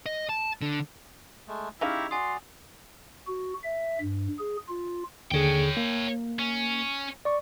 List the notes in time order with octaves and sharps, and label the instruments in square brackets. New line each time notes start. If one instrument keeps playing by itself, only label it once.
[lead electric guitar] D#5
A5
D3
[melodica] G#3 A3
[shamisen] C#3 D#4 F5 [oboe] E4 [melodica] G4 A#5 C#6 [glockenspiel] F7
[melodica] F#4 D5 [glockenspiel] G#5 D#6 [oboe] C6
[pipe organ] F#4
E5
G2
G#4
F4
[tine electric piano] D#2 D3 G#4 [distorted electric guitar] C#5 G5
[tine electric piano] A#3
[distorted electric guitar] C#4
[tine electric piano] D5 C#6